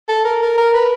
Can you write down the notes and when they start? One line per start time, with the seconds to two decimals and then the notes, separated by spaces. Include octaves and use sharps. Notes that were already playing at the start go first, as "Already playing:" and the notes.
0.08 A4
0.25 A#4
0.42 A#4
0.57 A#4
0.73 B4